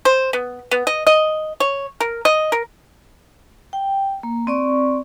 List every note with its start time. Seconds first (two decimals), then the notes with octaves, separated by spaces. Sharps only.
0.05 C5
0.33 B3
0.71 B3
0.87 D#5
1.07 D#5
1.60 C#5
2.00 A#4
2.25 D#5
2.52 A#4
3.73 G5
4.23 A#3
4.47 C4 D5 C#6